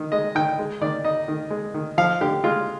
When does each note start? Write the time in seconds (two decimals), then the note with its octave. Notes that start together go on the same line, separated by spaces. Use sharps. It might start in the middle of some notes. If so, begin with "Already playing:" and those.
Already playing: D#3
0.12 G#3 D#5
0.35 D#3 G5
0.59 G#3
0.81 D#3 D5
1.05 D#4 D#5
1.28 D#3
1.50 G#3
1.74 D#3
1.98 F3 F5
2.21 D3 G4
2.44 G#3 F4